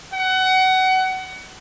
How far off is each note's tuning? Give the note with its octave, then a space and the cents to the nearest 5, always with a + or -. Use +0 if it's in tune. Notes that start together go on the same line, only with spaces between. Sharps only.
F#5 +25